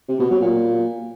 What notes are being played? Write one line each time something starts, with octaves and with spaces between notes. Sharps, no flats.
C3
B2
F#3
A#2